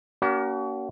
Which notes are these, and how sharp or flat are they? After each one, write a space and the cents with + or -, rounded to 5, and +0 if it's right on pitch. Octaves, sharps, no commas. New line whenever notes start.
A#3 +10 C#4 +45 F#4 +40